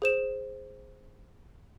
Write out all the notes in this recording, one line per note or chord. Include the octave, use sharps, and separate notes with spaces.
G#4 C5 E7